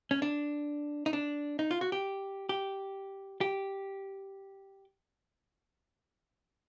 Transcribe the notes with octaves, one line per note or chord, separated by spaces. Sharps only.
C#4
D4
D#4
D4
D#4
F4
F#4
G4
G4
G4